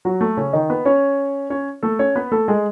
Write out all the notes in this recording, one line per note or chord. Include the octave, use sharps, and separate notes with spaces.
F#3 F#4
A3
C#3 C#4
D#3 D#4
B3 B4
C#4 C#5
C#4 C#5
A3 A4
C#4 C#5
B3 B4
A3 A4
G#3 G#4